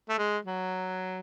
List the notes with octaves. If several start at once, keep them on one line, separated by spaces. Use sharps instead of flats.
A3
G#3
F#3